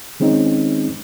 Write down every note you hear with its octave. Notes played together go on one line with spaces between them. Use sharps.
D#3 G#3 C4 C#4 D#4